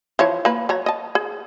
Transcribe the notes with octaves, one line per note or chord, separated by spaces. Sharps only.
E3 F3 C#5
A#3 B4
F#3 C#5 A#5
D#5 A5
G#4